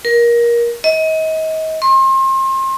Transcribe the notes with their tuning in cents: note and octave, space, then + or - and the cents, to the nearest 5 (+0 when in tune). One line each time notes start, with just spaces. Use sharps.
A#4 +20
D#5 +35
C6 +35